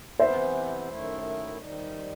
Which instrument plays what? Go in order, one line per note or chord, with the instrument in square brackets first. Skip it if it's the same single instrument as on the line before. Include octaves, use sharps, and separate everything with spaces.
[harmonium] C3 E3 B3 [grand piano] C5 E5
[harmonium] F#2 D#3 A3 E4
D#3 G3 D#4